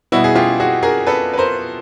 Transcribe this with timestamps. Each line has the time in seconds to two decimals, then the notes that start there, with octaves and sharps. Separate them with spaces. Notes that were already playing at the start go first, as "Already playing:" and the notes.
0.12 B2 G3 B3 E4 F#4
0.24 G#4
0.36 F4 G4
0.60 F#4 G#4
0.83 G#4 A#4
1.07 A4 B4
1.33 B4
1.38 A#4 C5